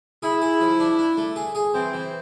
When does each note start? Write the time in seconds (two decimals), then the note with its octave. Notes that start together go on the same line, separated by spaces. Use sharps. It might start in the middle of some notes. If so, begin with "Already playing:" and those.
0.23 E4 G#4
0.42 G#4
0.61 F3
0.80 D4
0.99 D4
1.17 A3
1.36 G#4
1.55 G#4
1.74 E3 C4
1.94 E3